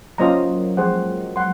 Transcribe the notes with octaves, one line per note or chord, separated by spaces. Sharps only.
F#3 A#3 C#4 F4 C5 D#5 A#5
F3 G#3 G#4 C5 F#5
F#5 C6